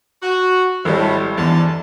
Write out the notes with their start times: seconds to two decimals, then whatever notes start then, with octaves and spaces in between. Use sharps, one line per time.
0.23 F#4
0.85 G#1 A2 G3
1.38 E2 G#2 D3 A5